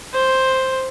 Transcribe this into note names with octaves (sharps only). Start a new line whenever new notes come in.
C5